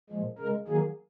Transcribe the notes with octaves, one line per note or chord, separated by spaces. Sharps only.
A#2 F3 G#3
C#3 G#3 A#4
D#3 F#3 A#3 G#4